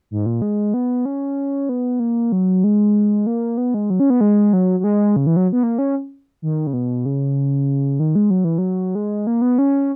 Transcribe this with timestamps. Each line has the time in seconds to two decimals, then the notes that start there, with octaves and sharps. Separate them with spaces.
0.11 G#2
0.26 A#2
0.42 G#3
0.74 B3
1.05 C#4
1.69 B3
2.00 A#3
2.32 F#3
2.64 G#3
3.27 A#3
3.57 B3
3.74 G#3
3.90 F#3
4.00 C#4
4.10 B3
4.21 G#3
4.53 F#3
4.80 F#3
4.84 G#3
5.16 C#3
5.27 E3
5.36 F#3
5.53 B3
5.63 A#3
5.78 C#4
6.42 D#3
6.67 C#3
6.73 B2
7.06 C#3
8.00 D#3
8.15 G#3
8.30 F#3
8.44 E3
8.58 F#3
8.95 G#3
9.27 A#3
9.42 B3
9.58 C#4